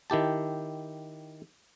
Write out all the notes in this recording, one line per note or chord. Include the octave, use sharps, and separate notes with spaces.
D#3 E4 G4 A5